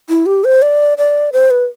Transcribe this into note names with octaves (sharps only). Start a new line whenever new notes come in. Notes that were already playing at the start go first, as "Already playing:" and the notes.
E4
G4
C5
D5
D5
C5
B4